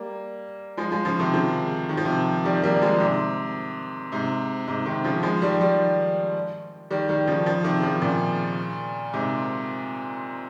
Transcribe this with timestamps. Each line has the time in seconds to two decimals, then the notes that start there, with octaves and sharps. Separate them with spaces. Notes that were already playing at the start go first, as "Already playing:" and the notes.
Already playing: G3 A#3
0.77 F3 G#3
0.92 F3 G#3
1.05 C#3 F3
1.20 C3 D#3
1.33 C#3 F3
1.89 D#3
1.97 F3
2.05 C3 D#3
2.45 D#3 G3
2.64 G3 A#3
2.82 F3 G#3
3.00 G#2 C3
4.12 G#2 C3
4.68 G#2 C3
4.86 C3 D#3
5.04 C#3 F3
5.23 F3 G#3
5.42 D#3 G3
5.61 D#3 G3
6.91 D#3 G3
7.09 D#3 G3
7.27 C#3 F3
7.46 C#3 F3
7.64 C3 D#3
7.83 C#3 F3
8.02 A#2 C#3
9.13 G#2 C3